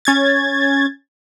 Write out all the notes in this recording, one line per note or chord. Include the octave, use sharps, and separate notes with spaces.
C#4 G#6 A6